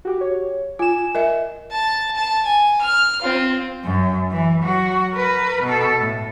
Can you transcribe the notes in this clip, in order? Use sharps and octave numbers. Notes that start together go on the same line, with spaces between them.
F#4 G4
C#5
F4 G#5 E7
A#4 D#5 E5
A5
A5
G#5
F6
C4 F4
F#2
E3
F#3 F#4
A#4 B4
B2 A4
A2